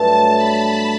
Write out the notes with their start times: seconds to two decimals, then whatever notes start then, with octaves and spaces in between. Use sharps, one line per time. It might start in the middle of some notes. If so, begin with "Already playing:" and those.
Already playing: G2 F#3 A3 A5
0.36 B5